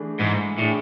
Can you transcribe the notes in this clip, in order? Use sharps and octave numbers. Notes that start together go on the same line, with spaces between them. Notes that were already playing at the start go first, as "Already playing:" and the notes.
Already playing: E3 A3 D4 G#4
G#2 E3
A2 A3 D4 G#4